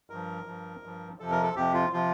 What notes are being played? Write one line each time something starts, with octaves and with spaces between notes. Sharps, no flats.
G2 F3 A#4
G2 F3
G2 F3
F2 C3 F3 A4
A#4
A4
F2 C3 F3 G4
F4
C3 F3 F4